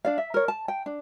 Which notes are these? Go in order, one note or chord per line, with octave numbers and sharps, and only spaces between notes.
D4 D5 F5
E5
A#4 C#5
A5
G5
D4